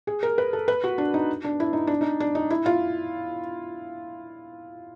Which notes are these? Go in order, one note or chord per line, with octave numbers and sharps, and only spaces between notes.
G#4
A#4
B4
A4
B4
F#4
D4
D#4
D4
E4
D#4
D4
D#4
D4
D#4
E4
F4